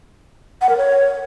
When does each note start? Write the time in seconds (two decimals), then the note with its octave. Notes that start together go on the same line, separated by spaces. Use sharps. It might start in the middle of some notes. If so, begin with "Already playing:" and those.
0.61 F#5
0.69 A#4
0.77 C#5